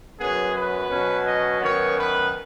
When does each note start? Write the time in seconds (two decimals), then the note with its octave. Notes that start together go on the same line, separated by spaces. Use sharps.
0.19 F#2 F#3 B3 G#4
0.54 B4
0.89 B2 F#3 C#4
1.26 D#5
1.60 F#2 D#3 B3 C#5
1.97 B4